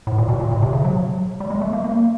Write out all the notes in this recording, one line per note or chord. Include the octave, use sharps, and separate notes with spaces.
A2
A#2
B2
A#2
A#2
C3
C#3
F#3
G3
G#3
A3
A#3
A#3